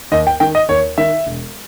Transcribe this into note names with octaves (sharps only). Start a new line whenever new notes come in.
D#2 D#5
G5
D#3 G5
D#5
D#2 C#5
D#3 E5
E1